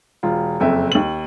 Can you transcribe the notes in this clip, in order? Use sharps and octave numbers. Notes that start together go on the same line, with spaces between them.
E1 F4
F#1 F2 E5
D#2 F#7